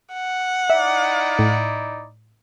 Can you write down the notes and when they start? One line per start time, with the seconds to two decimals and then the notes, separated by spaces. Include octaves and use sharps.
0.14 F#5
0.70 D#4 E4 D5 E5
1.39 A2